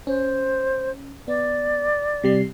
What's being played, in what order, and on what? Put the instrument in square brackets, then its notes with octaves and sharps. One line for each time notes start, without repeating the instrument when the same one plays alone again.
[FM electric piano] C#4 [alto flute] C5
[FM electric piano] B3 [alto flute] D5
[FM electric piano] C3 G3 C7